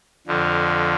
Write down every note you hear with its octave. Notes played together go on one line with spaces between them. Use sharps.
F2 D3 F3